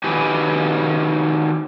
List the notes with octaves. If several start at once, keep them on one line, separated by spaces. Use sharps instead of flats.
D#3 F#4 G4 B4 G#5